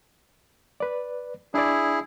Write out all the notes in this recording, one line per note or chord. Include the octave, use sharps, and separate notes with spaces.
B4 D5
D4 E4 G#4 D5